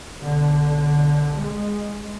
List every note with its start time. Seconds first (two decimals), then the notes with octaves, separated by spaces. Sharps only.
0.19 B1 D3
1.34 G#3